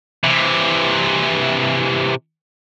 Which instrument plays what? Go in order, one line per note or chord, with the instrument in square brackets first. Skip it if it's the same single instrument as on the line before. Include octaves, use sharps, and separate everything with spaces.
[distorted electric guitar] C3 E3